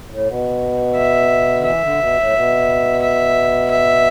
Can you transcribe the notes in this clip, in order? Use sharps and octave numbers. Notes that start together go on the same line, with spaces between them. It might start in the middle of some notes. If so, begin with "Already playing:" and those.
A2
B2
E5
D3
E3 E5
D3
B2
A2
B2
E5
E5